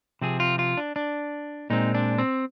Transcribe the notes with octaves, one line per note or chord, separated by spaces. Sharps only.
C3 F3 C4 G#4
F4
F4
D4
D4
A#2 G#3 C4 D#4
D4
C4